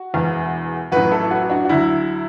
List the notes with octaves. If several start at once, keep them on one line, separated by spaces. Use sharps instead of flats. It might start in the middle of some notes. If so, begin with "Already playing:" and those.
Already playing: F#4
E1 E2 E3
A1 A2 F#3 F#4 B4
E4 A4
F#4 B4
D4 F#4
F#4
D2 D3 F#3 E4